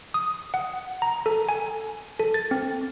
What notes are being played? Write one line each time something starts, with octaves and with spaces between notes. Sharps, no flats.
D#6
F#5
A#5
A4
G#5
A4
A6
C4